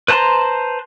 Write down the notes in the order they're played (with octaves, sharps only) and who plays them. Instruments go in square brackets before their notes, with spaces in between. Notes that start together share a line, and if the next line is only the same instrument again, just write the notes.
[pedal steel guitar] B4 C5 A5 A#5 C6